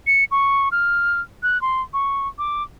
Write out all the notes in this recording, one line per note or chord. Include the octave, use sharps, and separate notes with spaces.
C#7
C#6
F6
F#6
C6
C#6
D6